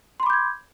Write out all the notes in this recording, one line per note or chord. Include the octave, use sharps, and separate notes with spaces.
B5 C6 D6 G6 G#6